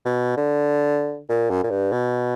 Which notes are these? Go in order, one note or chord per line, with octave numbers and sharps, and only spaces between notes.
B2
D3
A#2
F#2
A#2
G2
B2